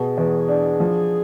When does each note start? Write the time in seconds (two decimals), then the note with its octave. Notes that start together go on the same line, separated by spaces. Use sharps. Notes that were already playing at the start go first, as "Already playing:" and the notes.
Already playing: B2 G#4
0.18 E2
0.48 D4
0.80 F3